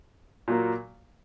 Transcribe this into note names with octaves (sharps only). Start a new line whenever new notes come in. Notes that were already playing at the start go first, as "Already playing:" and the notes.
A#2 F#3 A#3